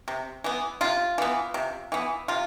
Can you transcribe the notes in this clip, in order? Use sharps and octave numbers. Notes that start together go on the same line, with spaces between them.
C3
E3 B3
C3 F4
E3 B3
C3
E3 B3
C3 F4